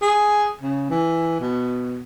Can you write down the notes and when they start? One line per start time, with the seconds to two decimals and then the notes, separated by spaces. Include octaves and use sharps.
0.02 G#4
0.61 C#3
0.90 E3
1.40 B2